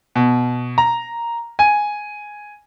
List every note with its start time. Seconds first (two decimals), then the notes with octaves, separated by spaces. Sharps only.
0.15 B2
0.78 A#5
1.59 G#5